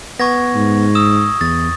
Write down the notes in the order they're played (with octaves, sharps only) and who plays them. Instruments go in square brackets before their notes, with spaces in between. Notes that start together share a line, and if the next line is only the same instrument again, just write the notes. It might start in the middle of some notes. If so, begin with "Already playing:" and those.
[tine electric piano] B3 [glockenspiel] C#6 G#6 A#6
[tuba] G#2
[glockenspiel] D#6 [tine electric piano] E6
[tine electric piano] E2 [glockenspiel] A6